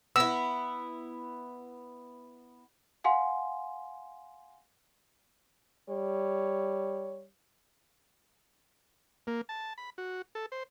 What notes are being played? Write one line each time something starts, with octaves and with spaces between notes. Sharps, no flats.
B3 E4 E6
F5 F#5 G#5 C6
G3 C#5
A#3
A5
B5
F#4
A4
C5